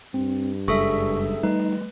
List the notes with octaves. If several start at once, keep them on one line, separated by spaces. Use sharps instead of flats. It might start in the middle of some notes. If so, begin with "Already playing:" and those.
G2 C4
F#1 G3 G#3 G#4 A4 E5 C#6
G3 A3 D#4 B4